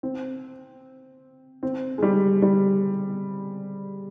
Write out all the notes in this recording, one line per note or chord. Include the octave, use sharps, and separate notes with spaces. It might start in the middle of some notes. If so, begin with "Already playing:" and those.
C4
C4
G#3
G3
G3